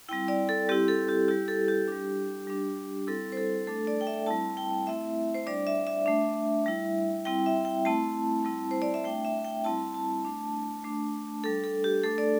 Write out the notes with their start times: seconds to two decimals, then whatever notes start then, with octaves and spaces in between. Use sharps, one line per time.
0.09 G3 C4 E4 G5
0.28 D5
0.49 A4
0.68 G3 C4 E4 G4
0.88 A4
1.09 G4
1.28 G3 E4 G4
1.48 A4
1.68 G4
1.88 G3 D4
2.47 G3 D4
3.07 G3 C4 E4 A4
3.32 C5
3.37 A4
3.67 A3 D4 A4
3.87 D5
4.01 G5
4.07 E5
4.26 G3 C4 E4 A5
4.57 G5
4.87 A3 C4 E4 E5
5.34 C5
5.46 G3 D4 D5
5.67 E5
5.87 E5
6.06 A3 D4
6.66 G3 E4
7.25 G3 C4 E4 G5
7.46 E5
7.65 G5
7.85 A3 C4 E4 A5
8.45 G3 C4 E4
8.71 C5
8.82 D5
8.94 E5
9.04 A3 D4 G5
9.25 E5
9.45 G5
9.64 G3 C4 E4 A5
9.94 A5
10.25 A3 D4
10.84 A3 D4
11.43 G3 D4 A4
11.64 A4
11.84 G4
12.04 A3 D4 A4
12.18 D5